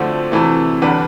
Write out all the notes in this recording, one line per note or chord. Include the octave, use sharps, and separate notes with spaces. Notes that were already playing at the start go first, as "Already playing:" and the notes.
Already playing: D2 D3 F3 A3 C4 D5
D2 C3 E3 A3
E2 D3 G3 D4 B4